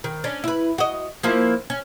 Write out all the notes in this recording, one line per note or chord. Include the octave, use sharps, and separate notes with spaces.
D#3
C#4 D4
E4 B4
F#4 D#5
F3 A#3 E4
C#4